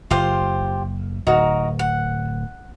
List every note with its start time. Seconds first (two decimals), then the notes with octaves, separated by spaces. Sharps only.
0.11 F#1 F4 G4 C5
1.27 D1 D#4 F#4 A#4
1.79 F#5